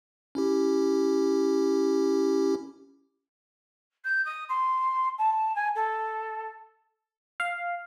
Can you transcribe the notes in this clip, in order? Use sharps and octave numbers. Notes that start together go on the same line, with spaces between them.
C#4 E4 G4
G6
D#6
C6
A5
G#5
A4
F5